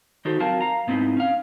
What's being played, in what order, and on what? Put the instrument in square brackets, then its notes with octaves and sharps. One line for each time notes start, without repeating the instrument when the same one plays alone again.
[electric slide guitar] D#3 D#4 F#4 G4 A4 C5
F#3 C4 F4 A#4 F5 A5
F5 A#5
G#2 B3 C4 D#4 E4
C#4 F5